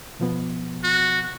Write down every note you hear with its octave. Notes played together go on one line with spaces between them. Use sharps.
B2 F3 B3
F#4